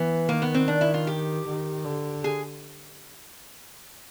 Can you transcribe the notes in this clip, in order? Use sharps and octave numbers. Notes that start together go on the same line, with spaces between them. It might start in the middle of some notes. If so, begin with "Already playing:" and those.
Already playing: E3 B3
D#3 A#3
B3
C4
D4
E4
F4
G4
D#3
D3
G#4